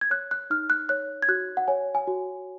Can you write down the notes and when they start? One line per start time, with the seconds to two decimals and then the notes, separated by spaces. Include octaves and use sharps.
0.01 G#6
0.10 C#5 F#6
0.31 F#6
0.50 D#4 F6
0.70 F#6
0.89 C#5 F#6
1.22 G#6
1.28 F#4 F#6
1.57 F#5
1.68 C#5 G#5
1.95 G#5
2.07 F#4